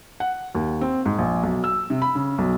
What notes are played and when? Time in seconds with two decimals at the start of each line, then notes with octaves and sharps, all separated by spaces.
0.20 F#5
0.55 D#2
0.81 C4
1.05 G#2
1.18 A#1
1.43 B1
1.64 E6
1.90 C3
2.02 B5
2.15 C#3
2.38 B1